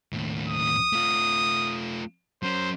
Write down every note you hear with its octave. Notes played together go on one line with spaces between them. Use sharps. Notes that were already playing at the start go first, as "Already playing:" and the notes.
D#2 A2
D#6
A3 F4
F#3 C#4 C5